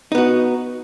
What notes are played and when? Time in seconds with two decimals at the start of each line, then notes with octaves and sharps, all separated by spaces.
0.12 D#4
0.15 B3
0.18 F#4